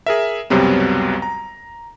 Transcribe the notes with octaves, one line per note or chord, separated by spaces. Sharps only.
G#4 A#4 E5
C#2 F#2 C3 F#3 G3 B3
A#5